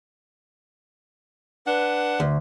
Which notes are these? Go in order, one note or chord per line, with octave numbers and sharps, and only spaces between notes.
D4 B4 F#5
D2